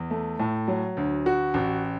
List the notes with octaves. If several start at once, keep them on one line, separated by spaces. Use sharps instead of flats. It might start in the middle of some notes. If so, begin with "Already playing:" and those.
Already playing: E2
A3
A2
F#3
D2
F#4
A1